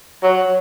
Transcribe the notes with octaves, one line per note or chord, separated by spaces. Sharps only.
F#3